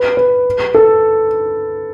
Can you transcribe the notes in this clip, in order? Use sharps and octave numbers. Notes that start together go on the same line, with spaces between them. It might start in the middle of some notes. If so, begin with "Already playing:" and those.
Already playing: B4
B4
A4